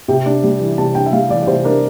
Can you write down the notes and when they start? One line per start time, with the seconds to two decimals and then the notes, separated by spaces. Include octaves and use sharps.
0.08 C3 G5
0.26 D4
0.44 G3
0.60 E3
0.78 C3 A5
0.95 D4 G5
1.06 E5
1.13 G3 F5
1.30 E3 D5
1.43 D5
1.47 C3 C5
1.64 D4 A#4